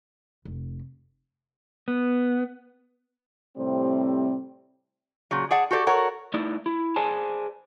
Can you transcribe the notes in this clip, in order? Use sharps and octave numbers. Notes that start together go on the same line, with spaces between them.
F1
B3
A2 C3 G3 C4
A#2 C#3 F#3
G#4 D5 F#5 A5
F#4 G4 A4 C5 D5
F#4 A4 A#4 C#5 F#5
A3 D#4 E4 D5
E4
G#4 C5 D5 G#5 A5